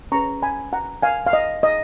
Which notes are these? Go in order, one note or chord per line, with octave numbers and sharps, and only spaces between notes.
C#4 G#4 B4 A#5 C#6
G#5 B5
F#5 A#5
F5 G#5
F5
D#5
D#5